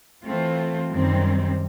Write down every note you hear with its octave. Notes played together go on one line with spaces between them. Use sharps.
E3 A3 C4 F4
F#2 D#3 G3 C4